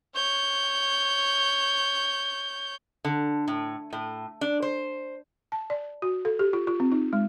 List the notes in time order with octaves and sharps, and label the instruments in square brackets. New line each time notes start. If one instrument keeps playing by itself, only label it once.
[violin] C#5 G6
[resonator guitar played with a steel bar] D3
A2
A2
D4
C5
[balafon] A5
D5
F#4
A4
G4
F4
F4
C4
D#4
G#3